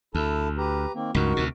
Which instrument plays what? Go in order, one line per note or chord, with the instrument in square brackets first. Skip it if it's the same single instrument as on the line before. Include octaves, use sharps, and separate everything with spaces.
[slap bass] D2 [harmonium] E4 A4 A5
[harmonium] G4 B4 A#5
D#3 A#3 C4
[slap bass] C#2 G2 [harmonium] D#4 F#4 A#4
[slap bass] D2 C3